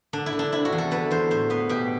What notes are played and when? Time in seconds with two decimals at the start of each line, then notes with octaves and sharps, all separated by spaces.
0.13 D3 D4
0.26 E4
0.33 D3
0.39 D4
0.52 C3 E4
0.65 F#4
0.72 E2
0.78 A4
0.91 D3 B4
1.11 E2 C5
1.31 A2 C5
1.50 B3 B4
1.69 B2 G4